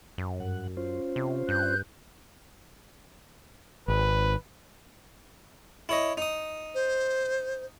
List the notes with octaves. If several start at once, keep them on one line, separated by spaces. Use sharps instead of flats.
F#2
G2 F#5
C#4 F4 C5
C3
G2 F#6 G6
G#1 B4
E4 C#5 D#5
D#4 D#6
C5